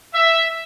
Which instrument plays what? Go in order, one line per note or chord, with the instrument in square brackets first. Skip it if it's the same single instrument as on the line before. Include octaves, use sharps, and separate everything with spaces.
[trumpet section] E5